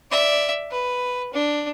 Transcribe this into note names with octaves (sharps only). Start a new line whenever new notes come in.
D5 E5
B4
D4